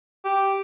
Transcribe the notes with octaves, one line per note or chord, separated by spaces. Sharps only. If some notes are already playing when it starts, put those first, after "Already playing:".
G4